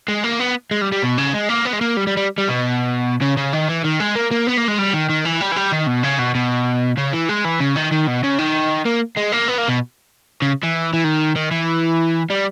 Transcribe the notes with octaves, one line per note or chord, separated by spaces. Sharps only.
G#3
A#3
B3
G#3
G3
G3
B2
C#3
G#3
A#3
B3
G#3
A#3
G3
G3
G3
G3
B2
C#3
C#3
D#3
E3
D#3
G#3
A#3
A#3
B3
A#3
G#3
G3
D#3
D#3
E3
G3
E3
G3
D#3
B2
C#3
B2
B2
C#3
E3
G#3
E3
C#3
D#3
D#3
B2
C#3
D#3
A#3
G#3
A#3
B3
A#3
B2
C#3
E3
E3
D#3
D#3
E3
G3